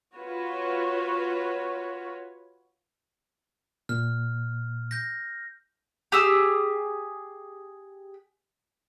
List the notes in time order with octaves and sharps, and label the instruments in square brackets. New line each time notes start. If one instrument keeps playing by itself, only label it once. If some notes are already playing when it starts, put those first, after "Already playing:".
[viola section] F4 F#4 B4 C#5
[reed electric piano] A#2 [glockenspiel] F6
[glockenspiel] G6 A#6
[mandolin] G4 G#4 E6